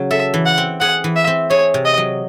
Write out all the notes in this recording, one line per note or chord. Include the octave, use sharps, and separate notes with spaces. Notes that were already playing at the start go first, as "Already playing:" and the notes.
Already playing: C#3 F#3
A4 E5
E3
F#5
C4
G#4 F#5
E3
E5
C4
G#4 C#5
C3
D#5
F#3